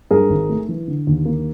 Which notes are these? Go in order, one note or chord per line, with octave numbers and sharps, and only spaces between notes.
G2 G#4 A#4
G#1
A3
E3
D3
D#2
A#3